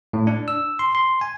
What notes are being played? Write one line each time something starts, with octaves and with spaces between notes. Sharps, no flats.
A2
D4
E6
C6
C6
G#5